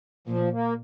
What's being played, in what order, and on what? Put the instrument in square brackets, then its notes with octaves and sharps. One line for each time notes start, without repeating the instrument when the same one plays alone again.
[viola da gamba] A#2 [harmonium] F3
[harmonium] A#3